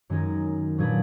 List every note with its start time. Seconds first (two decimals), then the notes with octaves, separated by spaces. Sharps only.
0.10 F#2 D#3 G#3 D#4 G#4
0.78 A#2 F#3 D4 G#4 B4